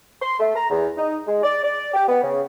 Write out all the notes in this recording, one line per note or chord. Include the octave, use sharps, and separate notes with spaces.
C6
A3
A#5
E2
D#4
G#3
D5
D5
G4
B3
C#3